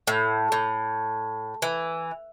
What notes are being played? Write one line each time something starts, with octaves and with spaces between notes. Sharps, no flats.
A2
A2
E3